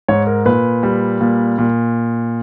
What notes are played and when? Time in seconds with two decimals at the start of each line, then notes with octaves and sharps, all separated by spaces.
0.08 G#2 C#5
0.27 A#4
0.46 A#2 B4
0.83 G3
1.21 A#2
1.59 A#2